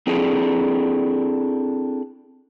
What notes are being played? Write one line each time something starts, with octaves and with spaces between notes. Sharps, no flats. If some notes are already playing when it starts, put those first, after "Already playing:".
C4 D4 E4 G#4 A4